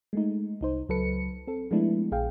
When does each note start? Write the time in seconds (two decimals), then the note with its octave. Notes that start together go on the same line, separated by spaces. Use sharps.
0.13 G#3 A3 D#4
0.61 C2 D#4 C5
0.89 C#2 F#3 A4 B4 C#7
1.47 C4 A4
1.71 F3 G#3 A3 B3 D4 E4
2.11 A#1 G#4 F5 G5